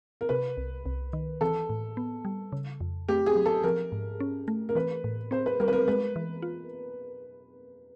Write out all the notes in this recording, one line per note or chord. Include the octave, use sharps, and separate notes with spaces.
A#4
C3 B4
C2
C2
D#3
E3 A4
A2
B3
G3
C#3
F2
A3 G4
G#4
F#3
A4
F3 A#4
G#2
C#4
A3
A#4
E3 B4
A2
C4 C5
B4
G3 A#4
B4
A#4
G#3 B4
E3
F4